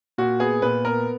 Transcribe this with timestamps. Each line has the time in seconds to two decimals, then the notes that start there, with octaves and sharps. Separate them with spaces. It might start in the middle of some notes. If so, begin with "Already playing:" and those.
0.18 A#2 F#4
0.40 B3 G#4
0.62 A#2 B4
0.85 B3 A#4